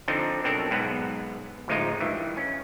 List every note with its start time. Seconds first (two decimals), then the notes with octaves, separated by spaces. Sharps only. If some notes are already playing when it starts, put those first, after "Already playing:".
0.08 D3 F3 C4 D4 D#4
0.44 B2 F#3 C4 D4 A4 A#4
0.70 B1 G#2 B3 B4 F#5
1.68 A1 D2 F3 G#3 D#4 F4
2.01 G2 D#3 E3
2.37 C#4